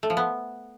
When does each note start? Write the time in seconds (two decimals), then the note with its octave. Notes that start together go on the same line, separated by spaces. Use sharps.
0.03 A3
0.10 F3
0.17 B3